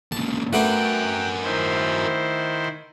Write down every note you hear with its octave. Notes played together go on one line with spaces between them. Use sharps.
A#2 C#3 A5
A3 B3 D4 F#4 A#4 G5 F#6
D#3 E4 C5